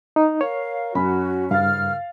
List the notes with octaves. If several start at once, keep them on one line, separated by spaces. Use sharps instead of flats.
D#4
A#4 C#5 F5
F#2 C#4 F#4 B5
C2 G2 C#3 F5 F6 A6